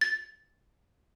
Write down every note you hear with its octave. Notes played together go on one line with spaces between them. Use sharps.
A6